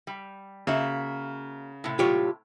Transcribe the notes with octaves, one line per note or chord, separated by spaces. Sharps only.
G3
C#3 A#3 F#4 E5
A2 C3
F4 G4 C#5